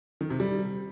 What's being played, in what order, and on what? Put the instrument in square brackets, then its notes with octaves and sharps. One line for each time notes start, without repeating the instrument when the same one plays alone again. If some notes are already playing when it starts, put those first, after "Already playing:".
[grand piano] D#3
C3
G3